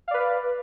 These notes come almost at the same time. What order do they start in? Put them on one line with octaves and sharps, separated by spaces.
F5 D5 B4